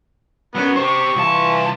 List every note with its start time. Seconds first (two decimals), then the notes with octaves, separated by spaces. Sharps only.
0.55 F#3 B3 C#4
0.76 G4 C5 C#6
1.16 C2 E3 F4 A5